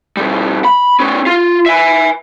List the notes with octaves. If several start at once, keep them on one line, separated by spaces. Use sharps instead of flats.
B2 G3
B5
B3 C#4
F4
E5 G#5